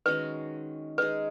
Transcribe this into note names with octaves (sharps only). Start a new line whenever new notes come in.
D#3 G#3 C#4 F#4 B4
G#3 D#4 G#4 B4